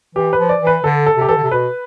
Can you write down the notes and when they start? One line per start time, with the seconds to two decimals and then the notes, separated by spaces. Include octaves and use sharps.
0.15 E3 G4
0.33 B4
0.38 F3
0.49 D5
0.61 E3
0.67 B4
0.84 D3 A4
1.06 A4
1.17 C3 G4
1.29 E3 A4
1.37 D3
1.43 C3
1.51 B2 B4